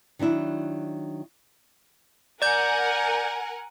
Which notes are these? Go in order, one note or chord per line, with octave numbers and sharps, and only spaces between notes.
D#3 F#3 D4 E4
A#4 D5 F#5 G#5 G6